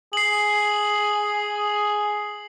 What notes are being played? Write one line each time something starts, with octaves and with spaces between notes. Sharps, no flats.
G#4 C7 F#7